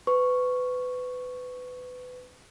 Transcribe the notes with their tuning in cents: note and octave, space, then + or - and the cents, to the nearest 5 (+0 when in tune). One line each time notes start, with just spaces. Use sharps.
B4 +25 C#6 +0